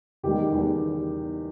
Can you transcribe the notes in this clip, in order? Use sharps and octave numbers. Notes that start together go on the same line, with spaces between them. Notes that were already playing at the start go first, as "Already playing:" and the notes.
E2 D#3 G3 G4
E2 D#3 G3